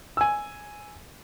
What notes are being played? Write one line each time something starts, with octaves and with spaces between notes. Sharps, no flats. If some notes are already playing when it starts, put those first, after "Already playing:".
G#5 E6